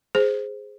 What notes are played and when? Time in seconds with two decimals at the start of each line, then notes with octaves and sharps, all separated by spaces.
0.15 G#4 C5